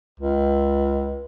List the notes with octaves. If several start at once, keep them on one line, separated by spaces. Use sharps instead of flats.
C#2